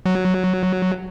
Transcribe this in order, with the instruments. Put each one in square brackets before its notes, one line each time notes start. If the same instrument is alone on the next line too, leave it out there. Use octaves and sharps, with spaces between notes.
[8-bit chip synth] F#3